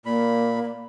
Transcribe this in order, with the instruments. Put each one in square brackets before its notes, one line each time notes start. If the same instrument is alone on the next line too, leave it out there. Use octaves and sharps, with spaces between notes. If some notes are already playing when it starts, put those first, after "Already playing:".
[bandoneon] A#2 B5 [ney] A#3